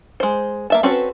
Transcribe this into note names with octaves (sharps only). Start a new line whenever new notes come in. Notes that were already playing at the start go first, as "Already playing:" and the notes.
G#3 C5
A#3 E5 A5
C4 C#4 F#4 A4 B4